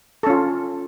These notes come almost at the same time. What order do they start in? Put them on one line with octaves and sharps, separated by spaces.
A4 C#4 F4